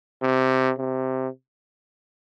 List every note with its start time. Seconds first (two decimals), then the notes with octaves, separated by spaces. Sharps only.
0.22 C3
0.78 C3